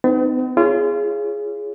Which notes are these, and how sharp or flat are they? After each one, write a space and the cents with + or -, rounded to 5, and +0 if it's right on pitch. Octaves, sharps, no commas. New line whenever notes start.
B3 +45 D#4 -20
F4 -30 G#4 +0 C#5 +0